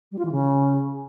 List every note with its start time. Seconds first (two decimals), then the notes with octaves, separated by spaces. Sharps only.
0.11 G3
0.18 F4
0.24 E3
0.31 C#3